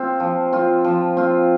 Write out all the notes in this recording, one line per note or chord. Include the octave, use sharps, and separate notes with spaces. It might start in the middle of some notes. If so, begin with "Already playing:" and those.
Already playing: C4 F4
F3
C4 F4
F3
C4 F4